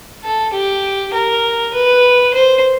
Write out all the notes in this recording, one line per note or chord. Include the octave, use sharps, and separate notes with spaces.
A4
G4
A#4
B4
C5